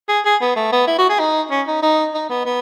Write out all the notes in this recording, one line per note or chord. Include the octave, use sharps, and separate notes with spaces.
G#4
G#4
B3
A3
B3
E4
F#4
G#4
D#4
C#4
D#4
D#4
D#4
B3
B3